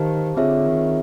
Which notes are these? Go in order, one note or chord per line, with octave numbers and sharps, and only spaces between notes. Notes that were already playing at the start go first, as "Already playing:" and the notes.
Already playing: D#3 G4 C5 F5 A5
D3 C4 F4 G#4 C#5 E5
D#3